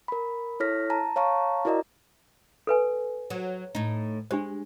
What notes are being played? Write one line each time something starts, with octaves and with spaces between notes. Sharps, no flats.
A#4 B5
E4 A4 C#5 F6 A#6 B6
A5 A#5
C#5 F5 A5 A#5 C#6
E4 F#4 A#4 D5 D#5 A#5
A4 B4 G#5
F#3
A2 D#4
G#3 D4 G4 C5